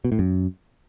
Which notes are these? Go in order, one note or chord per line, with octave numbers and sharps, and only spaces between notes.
B2
A2
F#2